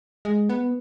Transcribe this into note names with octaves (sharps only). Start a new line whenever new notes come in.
G#3
B3